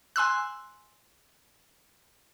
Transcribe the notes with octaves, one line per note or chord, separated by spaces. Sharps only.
G#5 C6 E6 F#6